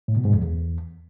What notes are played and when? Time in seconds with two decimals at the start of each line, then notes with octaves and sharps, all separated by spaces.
0.08 A2
0.17 B2
0.25 G#2
0.33 F2
0.42 E2